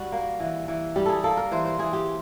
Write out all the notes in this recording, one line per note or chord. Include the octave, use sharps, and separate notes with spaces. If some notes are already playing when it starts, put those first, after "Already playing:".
Already playing: G3 F#4
A#3
E3
E3
G3 G4
G#4 A4
A#3 A4
A#4
E3 C5
C5
E3 G#4
G4